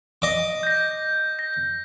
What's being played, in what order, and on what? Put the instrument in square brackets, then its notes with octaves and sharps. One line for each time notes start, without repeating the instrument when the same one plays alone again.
[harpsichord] D#5 D6
[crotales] G6 A#6
A#6